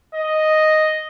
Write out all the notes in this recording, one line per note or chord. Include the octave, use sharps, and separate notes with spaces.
D#5